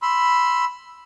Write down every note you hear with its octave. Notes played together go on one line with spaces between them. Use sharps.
B5 C6 E6